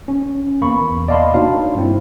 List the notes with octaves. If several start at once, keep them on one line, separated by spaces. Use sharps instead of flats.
C#4
E2 A#3 B5 C#6
D5 D#5 F5 A5 B5 C6
A#3 D4 D#4 F#4 C#5 F5
G2 C4 E4